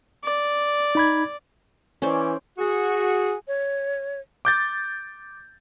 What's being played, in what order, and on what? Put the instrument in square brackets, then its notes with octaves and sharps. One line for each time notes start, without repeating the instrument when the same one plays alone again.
[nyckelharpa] D5
[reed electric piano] D#4 B5 G#6
[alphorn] E3 [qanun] C#4 C5 D5
[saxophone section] F#4 G#4
[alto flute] C#5
[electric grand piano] D6 G6 A6